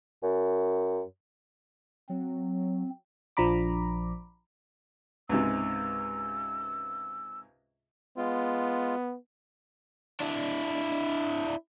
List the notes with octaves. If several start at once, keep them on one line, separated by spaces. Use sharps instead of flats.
F#2
F#3 C4
A#1 F3 D4 A#5 B5 D6
C#2 G#2 C3 E6
G#3 B3 F4
D4 E4